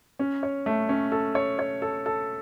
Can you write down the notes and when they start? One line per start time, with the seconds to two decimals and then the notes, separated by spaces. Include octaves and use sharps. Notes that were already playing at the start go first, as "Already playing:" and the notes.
0.19 C#4
0.43 C#5
0.66 A3
0.89 C#4
1.12 A4
1.35 C#5
1.59 C#5
1.82 A4
2.06 A4